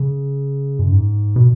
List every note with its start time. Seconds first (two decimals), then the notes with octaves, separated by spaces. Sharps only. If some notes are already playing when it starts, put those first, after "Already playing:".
Already playing: C#3
0.79 F#2
0.92 G#2
1.36 B2